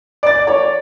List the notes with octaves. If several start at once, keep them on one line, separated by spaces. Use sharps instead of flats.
D5 A6 D7
C#5